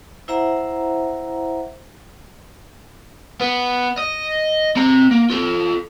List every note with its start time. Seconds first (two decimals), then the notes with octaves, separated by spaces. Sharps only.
0.28 E4 C5 E5 F#5 A#5
3.41 B3
3.98 D#5
4.76 C4 A#5
5.11 A#3
5.30 F4 A4